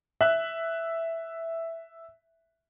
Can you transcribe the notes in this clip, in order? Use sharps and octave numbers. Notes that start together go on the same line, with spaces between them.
E5 F#6